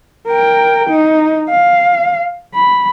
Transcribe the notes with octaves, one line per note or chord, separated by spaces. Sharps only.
A#4 G5
D#4
F5
B5